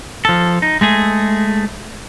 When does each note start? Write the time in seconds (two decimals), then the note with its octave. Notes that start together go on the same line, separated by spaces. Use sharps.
0.25 F3 A4
0.62 D#4
0.81 G#3 A3 G#4